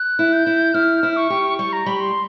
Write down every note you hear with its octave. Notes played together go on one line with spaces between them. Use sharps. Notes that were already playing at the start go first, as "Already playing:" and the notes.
Already playing: F#6
E4
G6
E4
E4 F6
E4
C#6
G4
G3 C#6
A#5
G3 B5
C6